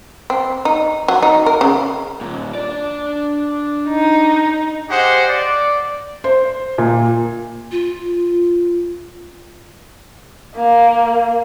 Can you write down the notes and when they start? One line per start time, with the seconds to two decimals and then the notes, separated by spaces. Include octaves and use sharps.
0.30 C4
0.65 D#4
1.08 F#3
1.22 D#4
1.46 A#4
1.61 C#3
2.21 D#2 A#2
2.55 D4 D5
3.88 D#4
4.89 G4 G#4 C5 D#5 F#5
5.28 D5
6.24 C5
6.78 A#2
7.72 F4
10.55 A#3